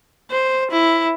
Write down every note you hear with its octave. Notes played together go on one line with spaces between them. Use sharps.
C5
E4